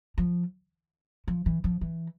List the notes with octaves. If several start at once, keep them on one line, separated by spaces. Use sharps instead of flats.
F3
F3
E3
F3
E3